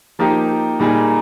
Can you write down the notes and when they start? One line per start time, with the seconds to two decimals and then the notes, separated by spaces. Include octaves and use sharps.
0.19 F3 A#3 D#4 G4
0.79 A#2 G3 A#3 D#4 G#4